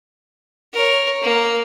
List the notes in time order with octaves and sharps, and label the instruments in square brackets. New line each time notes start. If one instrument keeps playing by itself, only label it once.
[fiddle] A#4 C#5
A#3